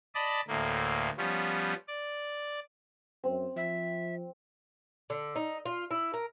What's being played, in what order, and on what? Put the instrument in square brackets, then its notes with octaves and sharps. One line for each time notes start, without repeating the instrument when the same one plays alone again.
[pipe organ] D5 D#5 A5 B5 D6
D2 A2 A#3
F3 G3 B3 C#4
D5
[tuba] F#2 [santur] C4
[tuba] F3 [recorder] E5
[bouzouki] D3
D#4
F4
E4
A#4